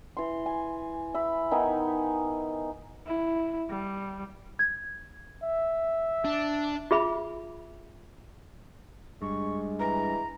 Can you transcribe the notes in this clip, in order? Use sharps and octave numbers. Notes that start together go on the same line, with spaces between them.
E3 C6
G#5
E5 B5
D#3 B3 D#4 G#5
E4
G3
G#6
E5
D4
F4 G#4 E5 B5
G2 G#3 C#6
E3 A#5